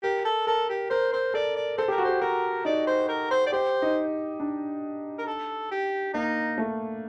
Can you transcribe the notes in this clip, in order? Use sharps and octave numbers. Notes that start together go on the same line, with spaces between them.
G4 A#4
A4
A4 A#4
G4
A#4 C5
C5
A4 D5
D5
A4 C5
G4 A#4
F#4
G4 C5
F#4 A#4
D#4 D5
C5
A#4
C5
D5
G4 C5
D#4
D4
A#4
A4
G4
A#3 D#4
A3